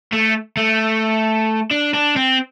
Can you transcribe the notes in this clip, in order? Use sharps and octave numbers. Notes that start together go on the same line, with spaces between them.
A3
A3
D4
D4
C4